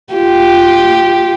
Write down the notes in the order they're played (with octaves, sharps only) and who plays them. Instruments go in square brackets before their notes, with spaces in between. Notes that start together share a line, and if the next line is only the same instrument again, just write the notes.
[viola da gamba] F4 G4